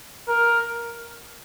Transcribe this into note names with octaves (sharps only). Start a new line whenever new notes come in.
A#4